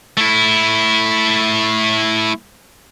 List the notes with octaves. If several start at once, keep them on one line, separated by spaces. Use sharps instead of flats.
A3 E4